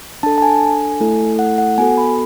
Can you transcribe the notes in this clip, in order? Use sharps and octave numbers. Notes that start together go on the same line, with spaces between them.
D4 A4 A5
A5
G#5
A3 E4 A4
F#5
F#5
B3 F#4 A4 G#5
B5